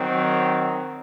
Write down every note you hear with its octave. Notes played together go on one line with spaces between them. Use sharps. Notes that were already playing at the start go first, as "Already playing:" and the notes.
Already playing: D#3 F#3 C4